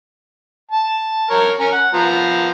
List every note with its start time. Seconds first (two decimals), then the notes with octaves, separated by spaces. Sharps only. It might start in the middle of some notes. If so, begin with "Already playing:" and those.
0.71 A5
1.30 A#4 C#5
1.60 C#4 A#4
1.72 F#5
1.94 F3 B3 A#5